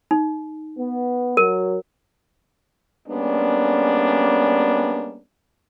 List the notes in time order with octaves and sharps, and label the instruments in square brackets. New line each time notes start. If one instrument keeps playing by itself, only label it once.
[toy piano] D#4
[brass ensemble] B3
[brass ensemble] F#3 [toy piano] A#4
[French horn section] G3 G#3 A#3 B3 C#4 D4